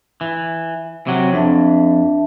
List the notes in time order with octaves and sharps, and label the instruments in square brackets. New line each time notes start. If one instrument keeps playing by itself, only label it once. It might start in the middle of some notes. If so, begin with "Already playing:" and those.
[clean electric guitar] E3
C3 F#3
[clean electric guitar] F2 [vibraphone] D4 E5 A5